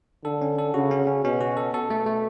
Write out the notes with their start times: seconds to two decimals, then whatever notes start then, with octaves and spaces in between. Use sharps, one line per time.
0.25 D3 A4
0.42 C#4
0.58 A4
0.74 C#3 F#4
0.91 C#4
1.07 C#4
1.24 B2 C#4
1.41 F#4
1.57 A4
1.74 B2 A4
1.90 A3
2.06 A3